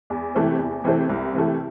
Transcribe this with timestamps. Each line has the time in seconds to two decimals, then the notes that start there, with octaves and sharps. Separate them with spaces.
0.10 E2
0.34 C3 E3 A3 C4
0.59 E2
0.84 C3 E3 A3 C4
1.09 C2
1.34 C3 E3 A3